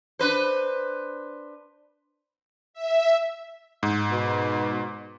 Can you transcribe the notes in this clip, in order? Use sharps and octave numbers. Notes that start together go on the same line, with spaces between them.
D4 B4 C5
E5
G#2
B2